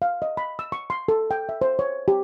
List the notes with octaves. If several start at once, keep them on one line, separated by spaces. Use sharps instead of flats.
F5
D#5
B5
E6
C#6
C6
A4
G5
E5
C5
C#5
G4